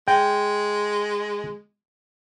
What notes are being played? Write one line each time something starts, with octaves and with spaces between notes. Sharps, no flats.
G#3 G5